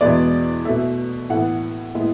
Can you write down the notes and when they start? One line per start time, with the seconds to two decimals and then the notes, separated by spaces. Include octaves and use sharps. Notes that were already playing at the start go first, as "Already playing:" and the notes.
0.01 E2 B2 G#3 B3 D5
0.65 B2 A3 E5
1.29 A2 E3 B3 F#5
1.95 A2 G#3 B3 E5